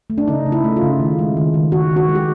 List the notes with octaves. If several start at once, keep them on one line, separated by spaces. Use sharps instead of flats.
A3
D4
C#3 D#4
C#3
E4
A3
F4
C#3
D#3
G#3
D#3
D#3
D#3 F#4
D#3
F#4
G#3
G4